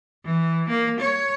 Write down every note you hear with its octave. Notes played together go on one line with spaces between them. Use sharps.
E3
A#3
C#5